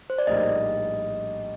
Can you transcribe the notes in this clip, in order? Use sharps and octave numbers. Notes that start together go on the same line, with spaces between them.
C5
D5
A#1 A2 G3 A#3 D#4 D#5